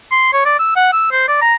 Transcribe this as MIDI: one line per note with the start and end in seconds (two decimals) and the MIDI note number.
0.12 0.32 84
0.33 0.44 73
0.45 0.57 74
0.59 0.72 88
0.76 0.91 78
0.93 1.11 88
1.12 1.28 72
1.28 1.39 74
1.42 1.55 82